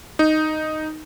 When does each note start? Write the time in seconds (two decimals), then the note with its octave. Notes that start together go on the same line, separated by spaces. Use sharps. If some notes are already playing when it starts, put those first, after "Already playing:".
0.19 D#4